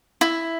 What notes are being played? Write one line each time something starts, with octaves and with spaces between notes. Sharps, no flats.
E4